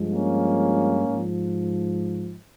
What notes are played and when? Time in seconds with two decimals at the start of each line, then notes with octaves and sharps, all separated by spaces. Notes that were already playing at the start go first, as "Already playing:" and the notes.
Already playing: G2 F3 G#3
0.10 A#3 C#4
1.08 G#2 F3